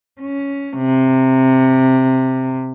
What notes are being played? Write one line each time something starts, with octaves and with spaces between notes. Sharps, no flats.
C#4
C3